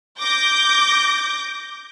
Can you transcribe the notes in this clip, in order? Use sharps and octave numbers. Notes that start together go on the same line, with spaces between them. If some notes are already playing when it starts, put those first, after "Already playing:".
D6 G6 A#6